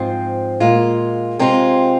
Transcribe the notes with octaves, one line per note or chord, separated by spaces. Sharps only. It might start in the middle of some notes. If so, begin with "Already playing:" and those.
Already playing: G#2 F3 C4
A#2 G#3 F4
C3 G#3 C4 F4